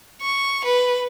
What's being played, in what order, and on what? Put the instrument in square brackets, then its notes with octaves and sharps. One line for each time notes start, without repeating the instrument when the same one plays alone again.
[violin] C#6
B4